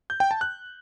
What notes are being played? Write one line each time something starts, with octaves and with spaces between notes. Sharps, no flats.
G6
G5
A5
F#6